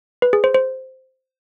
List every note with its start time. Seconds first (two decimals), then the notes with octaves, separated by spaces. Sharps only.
0.22 B4
0.33 G#4
0.44 C5
0.55 C5